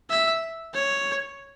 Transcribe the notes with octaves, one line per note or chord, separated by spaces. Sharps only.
E5
C#5